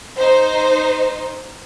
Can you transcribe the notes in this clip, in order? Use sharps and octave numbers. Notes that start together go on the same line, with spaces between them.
D#4 C5